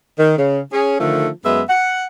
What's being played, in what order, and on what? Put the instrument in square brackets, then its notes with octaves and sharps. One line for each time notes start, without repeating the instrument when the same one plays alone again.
[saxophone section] D#3
C#3
C#4 G#4
D3 D#3 F3 A3
F#2 G#3 B3 E5
F#5